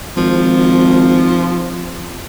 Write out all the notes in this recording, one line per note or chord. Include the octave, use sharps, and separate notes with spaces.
G#1 F3